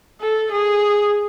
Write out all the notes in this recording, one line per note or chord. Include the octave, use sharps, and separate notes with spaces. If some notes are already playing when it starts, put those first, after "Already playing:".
A4
G#4